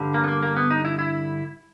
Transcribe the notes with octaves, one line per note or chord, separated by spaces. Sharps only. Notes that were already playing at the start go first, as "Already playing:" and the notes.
Already playing: G2 D3 G3
A#3
B3
A#3
A#3
B3
D#4
E4
E4